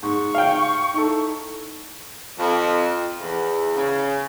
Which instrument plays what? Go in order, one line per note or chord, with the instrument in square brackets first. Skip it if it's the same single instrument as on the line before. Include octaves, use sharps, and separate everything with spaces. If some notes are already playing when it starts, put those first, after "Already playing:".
[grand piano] G#2 [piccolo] C#6
[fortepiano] F5 G5
[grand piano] D#4 E4 A4
[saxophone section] F2
E2
C#3